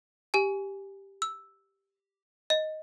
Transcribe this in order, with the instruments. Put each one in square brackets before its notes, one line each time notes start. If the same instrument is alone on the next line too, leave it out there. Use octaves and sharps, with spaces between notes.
[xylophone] G4 G#5
E6
D#5